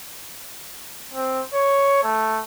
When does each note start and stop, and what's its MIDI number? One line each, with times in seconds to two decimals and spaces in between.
1.14 1.41 60
1.54 2.00 73
2.04 2.43 57